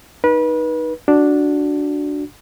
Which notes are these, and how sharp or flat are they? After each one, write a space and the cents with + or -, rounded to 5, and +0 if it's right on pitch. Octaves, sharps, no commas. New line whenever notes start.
D#4 +0 B4 -30
D4 +0 F#4 +0